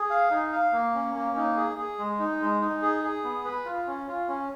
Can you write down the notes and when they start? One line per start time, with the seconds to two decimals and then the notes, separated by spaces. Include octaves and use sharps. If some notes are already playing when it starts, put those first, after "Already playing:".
Already playing: G#4
0.10 F5
0.31 D#4
0.52 F5
0.73 A#3
0.94 C#4
1.15 A#3
1.36 D#4
1.57 G#4
1.77 G#4
1.99 G#3
2.19 D#4
2.41 G#3
2.61 D#4
2.82 G#4
3.03 G#4
3.24 B3
3.45 B4
3.65 F4
3.87 C#4
4.08 F4
4.29 C#4